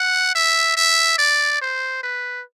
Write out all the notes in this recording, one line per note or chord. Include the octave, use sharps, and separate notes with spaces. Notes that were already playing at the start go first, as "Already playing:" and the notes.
Already playing: F#5
E5
E5
D5
C5
B4